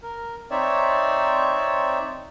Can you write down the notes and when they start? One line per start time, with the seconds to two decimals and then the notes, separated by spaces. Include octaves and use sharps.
0.03 A#4
0.51 C4 D#4 C#5 D5 E5